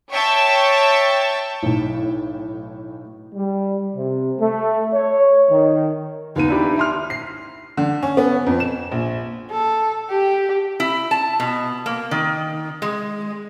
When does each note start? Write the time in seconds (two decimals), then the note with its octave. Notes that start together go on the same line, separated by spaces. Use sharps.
0.11 C#5 E5 G5 A5 C#6
1.63 B1 A2
3.34 G3
3.94 C3
4.39 A3
4.92 C#5
5.50 D#3
6.36 D#2 B3 D#4 D#7
6.48 D4 E4 G4
6.77 E5 C6 F6
7.10 C7
7.77 D3
8.03 C#4
8.17 B3
8.47 F2
8.60 E7
8.91 A#1
9.50 A4
10.10 G4
10.80 E4
11.11 A5
11.40 B2
11.86 A#3
12.11 D#3
12.82 G#3